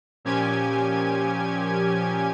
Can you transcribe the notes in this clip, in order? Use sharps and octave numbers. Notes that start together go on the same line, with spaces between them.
A#2 F3 C#4 G4 G#5 G#6